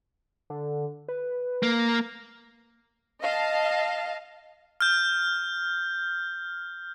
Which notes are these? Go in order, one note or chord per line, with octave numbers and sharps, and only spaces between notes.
D3
B4
A#3
D#5 F5 A5
F6 G6